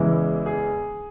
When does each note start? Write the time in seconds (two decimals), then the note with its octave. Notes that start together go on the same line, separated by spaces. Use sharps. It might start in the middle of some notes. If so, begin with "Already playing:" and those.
Already playing: E2 C#3 E3 G#3 E4
0.46 G#4